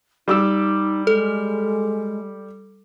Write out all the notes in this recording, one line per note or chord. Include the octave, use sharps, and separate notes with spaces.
G3 D#4 D6 E6
G#3 A4